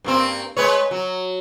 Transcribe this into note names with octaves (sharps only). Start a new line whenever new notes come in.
G2 A#3 C4
G#3 B4 C#5
F#3